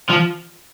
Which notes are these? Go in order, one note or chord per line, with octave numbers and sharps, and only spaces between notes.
F3